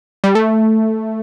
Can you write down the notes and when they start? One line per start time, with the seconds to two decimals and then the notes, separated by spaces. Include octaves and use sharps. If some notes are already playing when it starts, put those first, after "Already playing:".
0.24 G3
0.35 A3